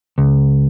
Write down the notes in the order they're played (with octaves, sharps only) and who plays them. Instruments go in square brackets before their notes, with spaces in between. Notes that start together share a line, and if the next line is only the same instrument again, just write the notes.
[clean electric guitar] C#2